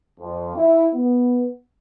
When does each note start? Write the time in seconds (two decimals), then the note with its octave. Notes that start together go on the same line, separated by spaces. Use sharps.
0.20 F2
0.57 E4
0.95 B3